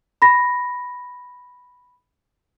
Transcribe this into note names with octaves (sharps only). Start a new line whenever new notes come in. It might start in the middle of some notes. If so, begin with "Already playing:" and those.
B5 A#6